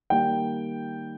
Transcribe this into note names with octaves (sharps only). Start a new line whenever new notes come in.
D#3 G3 A#3 G5